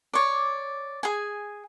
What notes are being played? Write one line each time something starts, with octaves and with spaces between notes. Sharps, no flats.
C#5 D5
G#4 G#5